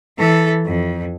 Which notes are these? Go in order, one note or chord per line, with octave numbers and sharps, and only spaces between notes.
E3 A4
F2